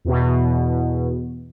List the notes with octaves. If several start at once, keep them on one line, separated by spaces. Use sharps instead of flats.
E2 B2